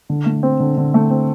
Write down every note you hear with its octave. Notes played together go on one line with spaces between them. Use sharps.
D3
A3
C4
D3
D3
A3
C4